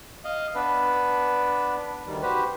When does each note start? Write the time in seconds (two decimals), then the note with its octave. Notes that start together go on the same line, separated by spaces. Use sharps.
0.25 D#5 F5
0.55 B3 D4 B4
2.07 D2 D#3 G3
2.22 F#4 G4 B4 C5